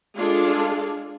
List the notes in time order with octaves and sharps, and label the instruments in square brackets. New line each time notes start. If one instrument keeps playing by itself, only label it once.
[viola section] G#3 D4 F4 G#4 A4